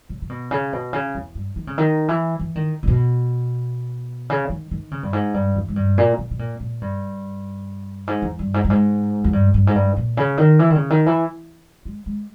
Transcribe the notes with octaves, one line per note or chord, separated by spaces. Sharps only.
C#3
C#3
B2
C#3
B2
C#3
E2
G2
D#3
C#3
D#3
E3
E3
D#3
A#2
B2
C#3
D#3
D#3
C#3
G2
G#2
G2
E2
G#2
G2
A#2
B2
B2
A#2
A#2
G2
G#2
E2
G2
G#2
G2
G#2
E2
G2
G2
G#2
G2
A#2
C#3
D#3
E3
D#3
C#3
D#3
E3
G#3
G#3